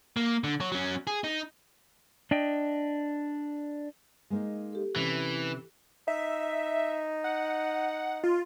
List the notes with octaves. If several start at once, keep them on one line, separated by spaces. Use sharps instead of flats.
A#3
D3
F#3 C#5
F#3 C#4
G#4
D#4
D4 D#5 G5
G#3 A#3 D#4
G4 A4
C3 E3 C#4
D#4 E5
F#5
F4